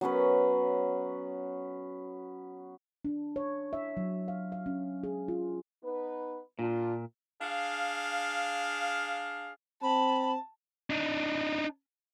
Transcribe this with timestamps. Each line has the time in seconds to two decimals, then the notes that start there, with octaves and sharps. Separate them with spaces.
0.01 F#3 B3 C#4 B4
3.05 D4
3.36 C#5
3.73 E5
3.97 F#3
4.28 F5
4.52 F5
4.66 C#4
5.04 G#4
5.28 F4
5.83 B3 D#4 B4
6.59 A#2 D4 F4
7.41 D4 G#4 F5
9.83 C4 A5 B5
10.90 D4 D#4